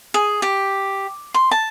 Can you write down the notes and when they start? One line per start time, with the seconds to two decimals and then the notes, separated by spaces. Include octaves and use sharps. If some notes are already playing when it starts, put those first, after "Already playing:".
0.14 G#4
0.42 G4
1.34 C6
1.51 A5